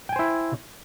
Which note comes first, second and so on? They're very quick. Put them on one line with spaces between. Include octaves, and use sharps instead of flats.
G5 G#5 C5 E4